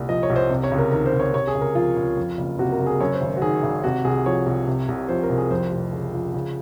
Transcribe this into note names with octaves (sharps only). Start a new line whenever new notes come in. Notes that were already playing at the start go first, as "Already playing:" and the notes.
Already playing: C2 A#2
F3 D#5
C#5
C2
C5
C3
C#5
C#2
A#4
D#3 A#4
C5
C#2
C#5
C3 C#5
G#4
C#2
A#4
F3 F4
C#2
F2
F#1
C3 F#4
A#4
F#1
G#4
F#2 C#5
C5
G#1
F#4
D#3 G#4
G#1
C3 F#4
C2 G#4
F3 C#5
C2
C3
C2
F3 C5
A#4
C2
G#4
F2 C5
F1
C#3
F3
C#3